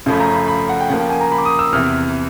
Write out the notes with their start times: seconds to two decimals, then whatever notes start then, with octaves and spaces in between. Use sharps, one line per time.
0.06 F#2 C#3 F3 A3 B5
0.20 A#5
0.33 B5
0.48 B5
0.69 F#5
0.81 G5
0.89 C#3 F3 A#3 F#5
1.00 G5
1.10 G#5
1.21 A#5
1.32 B5
1.38 D6
1.45 D#6
1.59 E6
1.72 E2 C3 E3 F6